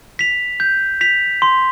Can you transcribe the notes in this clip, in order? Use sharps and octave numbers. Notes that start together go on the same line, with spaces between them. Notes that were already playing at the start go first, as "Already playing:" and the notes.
B6 F7
G6
B6 F7
C6